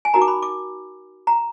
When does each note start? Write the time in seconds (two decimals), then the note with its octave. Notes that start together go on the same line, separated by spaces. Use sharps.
0.05 G#5
0.14 D#4 F#4 A#4 A#5
0.22 D6
0.28 B5
0.42 D6
1.27 A#5